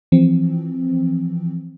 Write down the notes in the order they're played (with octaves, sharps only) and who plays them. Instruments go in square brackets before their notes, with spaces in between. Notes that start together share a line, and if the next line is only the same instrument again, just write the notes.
[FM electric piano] E3 F3 C4